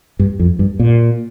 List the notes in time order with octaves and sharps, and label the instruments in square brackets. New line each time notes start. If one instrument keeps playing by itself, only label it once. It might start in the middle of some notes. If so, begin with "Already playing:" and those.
[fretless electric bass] G2
F2
G2
A#2